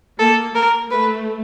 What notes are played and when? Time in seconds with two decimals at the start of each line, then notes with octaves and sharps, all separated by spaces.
0.19 A#3 A4
0.55 A#3 A#4
0.90 A3 B4